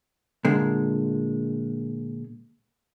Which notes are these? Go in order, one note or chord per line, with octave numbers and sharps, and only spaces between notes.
A#2 D3 G#3